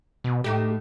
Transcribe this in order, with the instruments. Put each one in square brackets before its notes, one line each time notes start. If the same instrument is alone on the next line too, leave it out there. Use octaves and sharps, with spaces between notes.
[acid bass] B2
[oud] A2 A3 D#4 [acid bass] G4